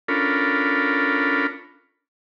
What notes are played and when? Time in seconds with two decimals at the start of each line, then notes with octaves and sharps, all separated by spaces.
0.08 C#4 D4 F4 A4 A#4 B5